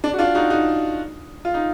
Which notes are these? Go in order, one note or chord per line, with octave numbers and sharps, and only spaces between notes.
D4
F#4
D4 F4
D#4 F#4
D#4 F#4
F4
D#4